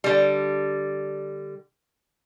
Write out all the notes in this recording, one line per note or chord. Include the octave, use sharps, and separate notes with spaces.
D3 G3